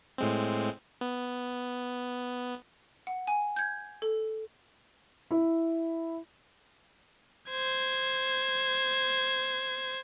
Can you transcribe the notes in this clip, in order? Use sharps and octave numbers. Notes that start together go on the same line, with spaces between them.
A2 G#3 C4
B3
F#5
G#5
G6 G#6
A4
E4
C5 G#6